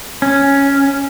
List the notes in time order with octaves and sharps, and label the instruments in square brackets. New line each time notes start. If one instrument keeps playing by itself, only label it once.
[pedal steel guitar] C#4